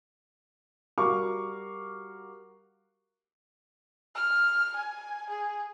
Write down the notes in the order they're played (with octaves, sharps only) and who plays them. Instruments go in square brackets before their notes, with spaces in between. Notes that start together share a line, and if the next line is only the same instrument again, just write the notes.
[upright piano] G3 F#4 A#4 F5 C#6 D6
[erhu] F6
G#5
G#4